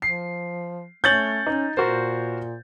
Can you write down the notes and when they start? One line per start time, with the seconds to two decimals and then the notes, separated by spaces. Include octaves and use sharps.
0.02 F3 C7
1.04 A3 C#4 C#5 G6 A6 F#7
1.47 C#4 D#4
1.77 A#2 F#4 A#4 C5